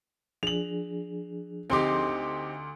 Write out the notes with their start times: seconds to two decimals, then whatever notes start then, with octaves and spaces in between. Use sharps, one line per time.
0.43 F3 D4 G#4 F7 F#7
1.70 D2 C4 D#4 G4 C6 D6